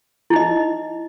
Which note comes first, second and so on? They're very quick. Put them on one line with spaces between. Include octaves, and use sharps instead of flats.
E4 D#4 D#5